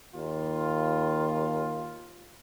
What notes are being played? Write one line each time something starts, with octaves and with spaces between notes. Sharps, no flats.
D#2 F4